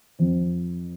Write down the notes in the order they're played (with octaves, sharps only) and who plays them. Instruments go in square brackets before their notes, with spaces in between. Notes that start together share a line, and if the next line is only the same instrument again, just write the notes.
[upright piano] F2 F3 C4